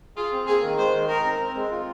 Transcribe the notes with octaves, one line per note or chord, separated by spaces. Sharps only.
F4 G#4
C4
A#3 G#4
D#3
G#3 C5
D#3
D#4 A#4
C4
C4
G#3
F4